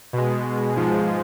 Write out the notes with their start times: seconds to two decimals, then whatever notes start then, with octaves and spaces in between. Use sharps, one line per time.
0.13 B2 G#3
0.76 G#2 F3 G#3